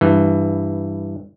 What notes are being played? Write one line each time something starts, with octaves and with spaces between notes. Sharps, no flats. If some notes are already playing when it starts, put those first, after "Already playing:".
G2 E3